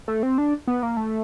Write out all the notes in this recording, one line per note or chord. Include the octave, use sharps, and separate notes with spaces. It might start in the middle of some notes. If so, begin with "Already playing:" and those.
A3
C4
D4
B3
A#3
A3